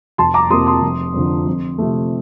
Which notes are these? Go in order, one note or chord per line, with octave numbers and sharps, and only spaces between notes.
F1 A5 C6
A#5 D6
F2 C3 F3 A#3 C6 D#6
C6 D#6
F1
F2 D3 F3
F2
C3 F3 A3